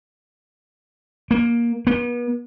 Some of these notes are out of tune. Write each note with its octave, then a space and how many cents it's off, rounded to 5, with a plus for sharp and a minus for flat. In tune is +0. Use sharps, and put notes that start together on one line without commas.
A#3 +15
B3 -40